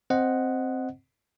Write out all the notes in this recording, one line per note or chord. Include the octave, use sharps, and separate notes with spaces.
C4 C5 D#5 F#5